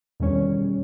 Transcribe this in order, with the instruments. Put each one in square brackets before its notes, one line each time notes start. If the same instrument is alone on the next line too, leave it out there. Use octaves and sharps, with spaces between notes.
[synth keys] E2 B2 D#3 G3 C#4 C#5